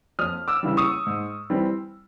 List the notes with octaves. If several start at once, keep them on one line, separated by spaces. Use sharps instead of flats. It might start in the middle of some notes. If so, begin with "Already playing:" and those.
F2 D#6 F6
D6 E6
C#3 E3 G3
C#6 D#6
G#2
E3 G3 C4